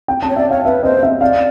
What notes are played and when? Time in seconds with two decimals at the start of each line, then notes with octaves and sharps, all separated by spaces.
0.08 G5
0.23 A5
0.30 C#5
0.36 D5 E5
0.50 C#5 F5
0.65 B4 E5
0.83 C5 D#5
1.03 E5
1.21 D5 F5